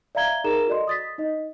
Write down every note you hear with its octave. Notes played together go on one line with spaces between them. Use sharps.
D5 E5 F5 A#5 G#6 G7
D#4 G#4 A#4 A#5 E7
F#4 A4 D5 D#5 C6
D#6 A6 B6
D#4 D#5